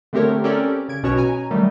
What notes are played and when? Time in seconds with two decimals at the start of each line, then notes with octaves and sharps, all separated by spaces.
0.13 D3 A3 C4 G4 A#4 C#5
0.43 C4 C#4 G4 A4 A#4 D5
0.88 C#3 G#6 D7
1.03 B1 B2 C#4 F#4 C#5 E7
1.17 G#5 A#5
1.51 D#3 F#3 G3 A3